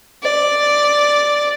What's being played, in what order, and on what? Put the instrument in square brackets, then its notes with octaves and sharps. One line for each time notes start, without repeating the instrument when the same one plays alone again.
[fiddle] D5